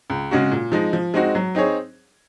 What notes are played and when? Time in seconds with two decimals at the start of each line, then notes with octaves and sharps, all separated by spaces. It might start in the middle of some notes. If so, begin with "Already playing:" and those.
0.10 C#2
0.31 C#3 G#3 C#4 F#4
0.51 A#2
0.72 F3 G#3 D#4
0.93 F3
1.14 G#3 C4 D#4 F#4
1.35 F#3
1.55 C4 D#4 G#4 C#5